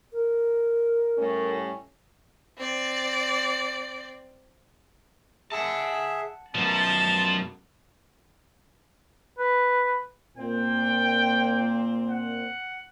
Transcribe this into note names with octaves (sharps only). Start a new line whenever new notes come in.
A#4
A2 G3 C#4
C4 D5
G#4 E5 F#5 A5
F#2 B2 F3 B3 A5
B4
A#2 C4 G5
F#5